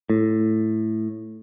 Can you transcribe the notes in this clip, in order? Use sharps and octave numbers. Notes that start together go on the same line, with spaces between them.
A2